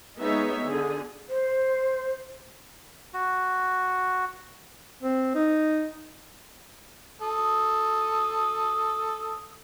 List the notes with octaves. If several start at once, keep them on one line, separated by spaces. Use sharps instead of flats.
G#3 B3 D#4 G#4 C#5 E5
D3 G#4
C5
F#4
C4
D#4
A4 D#6